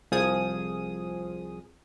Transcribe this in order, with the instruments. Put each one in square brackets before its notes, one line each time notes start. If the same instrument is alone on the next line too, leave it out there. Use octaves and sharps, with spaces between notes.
[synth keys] C2 F3 G#4 D#6